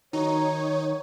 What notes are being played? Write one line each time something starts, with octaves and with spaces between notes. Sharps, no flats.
D#3 F#3 D#4 C#5